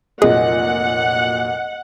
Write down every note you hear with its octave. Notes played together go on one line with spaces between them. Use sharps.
F1 A#2 F#3 G#4 D#5 F#5